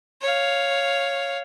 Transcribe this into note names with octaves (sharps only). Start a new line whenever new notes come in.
C#5 F5